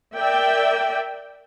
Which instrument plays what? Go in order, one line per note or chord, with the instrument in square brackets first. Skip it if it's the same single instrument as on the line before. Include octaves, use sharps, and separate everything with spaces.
[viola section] A#4 D5 E5 G5